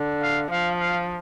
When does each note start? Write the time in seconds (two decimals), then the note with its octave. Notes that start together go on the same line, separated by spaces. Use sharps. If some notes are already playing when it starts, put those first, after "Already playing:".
Already playing: D3
0.23 F5
0.51 F3 F5
0.80 F5